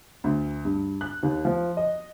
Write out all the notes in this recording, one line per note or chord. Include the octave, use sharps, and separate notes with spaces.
D2
G2
F#6
D#2
F3
D#5